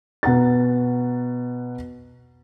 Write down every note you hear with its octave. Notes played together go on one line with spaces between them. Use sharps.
B2 F#5 A#5 A6